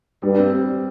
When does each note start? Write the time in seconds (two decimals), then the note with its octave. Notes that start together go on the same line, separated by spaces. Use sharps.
0.22 G2 G3
0.38 C4
0.52 G3